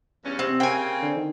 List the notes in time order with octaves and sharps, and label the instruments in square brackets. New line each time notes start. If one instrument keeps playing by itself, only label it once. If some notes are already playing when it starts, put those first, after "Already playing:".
[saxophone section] E2 G2 C#4
[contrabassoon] C3 [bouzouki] C4
[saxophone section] C#3 A#3 C4 [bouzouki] G5 G#5
[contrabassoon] D3
D#3